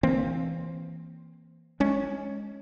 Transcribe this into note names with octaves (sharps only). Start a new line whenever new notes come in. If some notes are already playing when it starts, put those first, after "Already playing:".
E3 A#3 C4
G#3 C#4